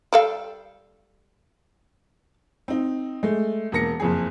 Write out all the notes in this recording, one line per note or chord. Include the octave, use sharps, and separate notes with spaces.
G3 A4 F5
C4 D#4
G#3 A3
E1 A#3 A#6 C#7
F#1 F2 G#4